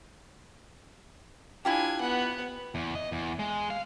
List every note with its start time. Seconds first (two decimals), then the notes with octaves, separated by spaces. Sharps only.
1.65 D4 E4 F4 G4 G#5
2.00 B3 F#5
2.75 E2
2.95 D#5
3.12 E2
3.39 G#3
3.70 F5